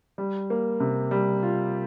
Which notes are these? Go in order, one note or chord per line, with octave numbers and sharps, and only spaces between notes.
G3
A#3
C3
G3
F4